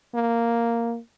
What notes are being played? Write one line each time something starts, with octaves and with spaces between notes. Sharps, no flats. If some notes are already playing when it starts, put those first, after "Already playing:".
A#3